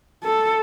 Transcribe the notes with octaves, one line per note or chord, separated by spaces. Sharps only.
A4